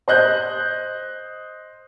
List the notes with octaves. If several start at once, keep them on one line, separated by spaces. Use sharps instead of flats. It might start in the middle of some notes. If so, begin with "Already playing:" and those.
C5 D#5 F#6 G6